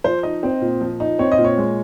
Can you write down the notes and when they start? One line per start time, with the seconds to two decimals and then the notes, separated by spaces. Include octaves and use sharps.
0.04 F3 C5
0.23 D#4 D#5
0.43 C4
0.61 A#2
0.81 F3
1.00 D#4
1.19 C4 C#5
1.32 D#5
1.38 A#2
1.44 C#5
1.58 G#3